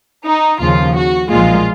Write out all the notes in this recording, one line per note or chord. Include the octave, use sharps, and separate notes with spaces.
D#4
D#2 C#3 F3 F4
F#4
B1 A#2 F3 G#3 F4